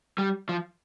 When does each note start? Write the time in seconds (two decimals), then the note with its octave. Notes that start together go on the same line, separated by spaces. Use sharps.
0.18 G3
0.49 F3